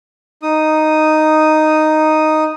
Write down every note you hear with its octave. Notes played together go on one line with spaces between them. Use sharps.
D#4 D#6